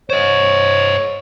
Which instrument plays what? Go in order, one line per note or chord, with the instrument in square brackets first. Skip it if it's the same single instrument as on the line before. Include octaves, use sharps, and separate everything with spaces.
[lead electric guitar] C5 D#5 [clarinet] C#5